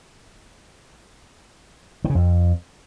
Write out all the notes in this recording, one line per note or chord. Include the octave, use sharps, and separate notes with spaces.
D#3
C#3
F2